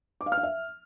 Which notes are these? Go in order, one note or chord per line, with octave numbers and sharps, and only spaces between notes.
D6
F5
F6
F5
E5